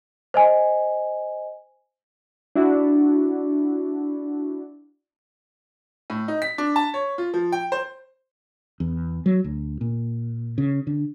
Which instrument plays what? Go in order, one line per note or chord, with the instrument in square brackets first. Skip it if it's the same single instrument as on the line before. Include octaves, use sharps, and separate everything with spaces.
[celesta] C5 D#5 G#5
[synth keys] D4 E4 F#4
[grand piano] A2
D#4
B6
D4
A5
C#5
F4
F3
G5
C5
[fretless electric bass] E2
F#3
D2
A#2
C#3
D3